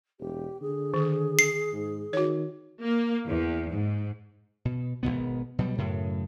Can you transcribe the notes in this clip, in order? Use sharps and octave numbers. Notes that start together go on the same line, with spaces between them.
E1 G4
D3 G#4
D#3
C7
G#2
D#3 F#4 C#5
A#3
E2
G#2
B2
G#1 F2 B2 B3
B2 F#3 G3
F#2 A2 C#3